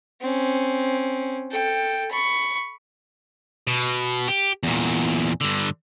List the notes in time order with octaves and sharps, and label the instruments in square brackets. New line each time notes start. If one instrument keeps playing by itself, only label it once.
[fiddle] C4 C#4
A4 G5
B5 C#6
[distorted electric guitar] B2
G4
E2 A#2
G2 D3